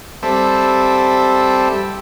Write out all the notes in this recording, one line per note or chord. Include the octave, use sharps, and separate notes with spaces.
G3 C4 A4 E5